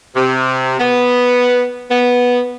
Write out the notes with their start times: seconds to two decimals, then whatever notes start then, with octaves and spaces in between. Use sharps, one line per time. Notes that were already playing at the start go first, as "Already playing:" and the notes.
0.15 C3
0.79 B3
1.91 B3